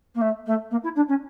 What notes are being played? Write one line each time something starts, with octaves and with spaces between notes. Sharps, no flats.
A#3
A3
A3
A#3
E4
D4
C#4